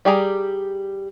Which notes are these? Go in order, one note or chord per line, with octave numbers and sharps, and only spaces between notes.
G3 G4 G#4 A#5